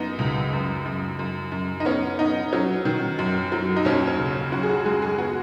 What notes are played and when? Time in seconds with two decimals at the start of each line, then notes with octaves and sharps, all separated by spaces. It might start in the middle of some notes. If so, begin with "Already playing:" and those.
Already playing: F#2 B3 D#4
0.19 C#2
0.53 F#2
0.85 F#2
1.19 F#2
1.52 F#2
1.80 D#4
1.85 B3 C#4
2.19 B3 D#4
2.53 F#3 C#4
2.85 D#3
3.19 F#2
3.52 F#3
3.76 D#4
3.85 D#2 C#4
4.07 C#4
4.18 C#3
4.52 F#2 F#4
4.63 G#4
4.69 F#4
4.85 G#3 G#4
5.02 G#4
5.18 B3 F#4